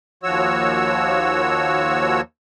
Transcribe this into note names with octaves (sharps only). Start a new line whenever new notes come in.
D#2 F3 F#4 C#5 E6